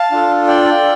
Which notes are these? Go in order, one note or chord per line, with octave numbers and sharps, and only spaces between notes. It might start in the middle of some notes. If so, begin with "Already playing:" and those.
Already playing: F5 A5
D4 F4 A4
D5 G5